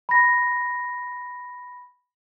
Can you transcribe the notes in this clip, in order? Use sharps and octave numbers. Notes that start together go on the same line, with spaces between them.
B5 A#6